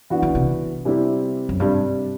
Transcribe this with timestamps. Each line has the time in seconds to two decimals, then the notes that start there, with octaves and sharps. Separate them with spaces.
0.10 E3 B3 D4 F#4
0.22 D3
0.35 C3
0.85 C3 G3 C4 E4 G4
1.49 F#2
1.60 G2 C3 G3 D4